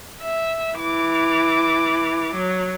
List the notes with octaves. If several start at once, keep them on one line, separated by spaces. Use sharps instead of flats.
E5
E3 D6
F#3